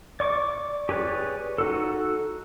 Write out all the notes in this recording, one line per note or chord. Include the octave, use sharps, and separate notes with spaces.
D5 C#6 D6
G4 G#4 B4 C#5 D5
D#4 F#4 A4